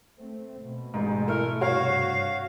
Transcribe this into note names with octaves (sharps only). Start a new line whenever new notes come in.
A3 C4
B2
A1 G#2
A3 E4 A#4
G2 C3 F#4 C#5 F5